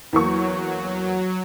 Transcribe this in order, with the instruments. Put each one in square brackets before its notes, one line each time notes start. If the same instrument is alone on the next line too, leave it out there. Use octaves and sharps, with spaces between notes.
[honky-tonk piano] E2 A#3 C#6 [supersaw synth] F#3